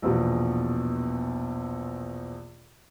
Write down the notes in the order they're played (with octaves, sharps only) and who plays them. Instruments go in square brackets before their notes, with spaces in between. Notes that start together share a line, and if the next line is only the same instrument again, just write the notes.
[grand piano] A#1 E2 B2